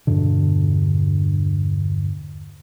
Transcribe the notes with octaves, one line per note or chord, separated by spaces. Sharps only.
E2 G2 B2 D3